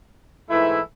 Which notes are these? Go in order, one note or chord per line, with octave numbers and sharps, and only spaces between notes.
G#2 E3 A3 E4